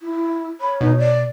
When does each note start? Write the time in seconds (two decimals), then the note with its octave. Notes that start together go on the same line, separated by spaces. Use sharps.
0.02 E4
0.60 C#5 B5
0.81 B2 D#4
0.99 D5